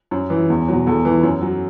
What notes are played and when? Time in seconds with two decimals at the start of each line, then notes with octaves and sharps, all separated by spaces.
0.11 F#2
0.30 E3
0.50 E2
0.68 B2 F#3
0.87 E2 A4
1.05 E3
1.23 F#2
1.42 F#3